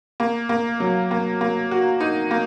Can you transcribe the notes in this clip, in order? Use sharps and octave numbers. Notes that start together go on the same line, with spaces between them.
A#3
A#3
F#3
A#3
A#3
F#4
D#4
A#3